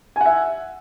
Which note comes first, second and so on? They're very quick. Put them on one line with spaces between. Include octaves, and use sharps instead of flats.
G#5 F#5 E5